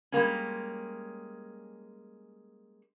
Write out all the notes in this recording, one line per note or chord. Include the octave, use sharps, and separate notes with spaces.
G3 G#3 A#3 C#4